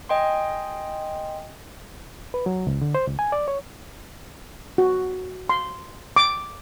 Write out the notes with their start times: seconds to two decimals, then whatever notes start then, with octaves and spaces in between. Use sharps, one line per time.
0.09 D#5 G5 G#5 C6
2.34 B4
2.46 F#3
2.67 C#2
2.81 D3
2.95 C5
3.07 C#2
3.19 G#5
3.32 D5
3.48 C#5
4.78 F#4
5.49 C6
6.16 D6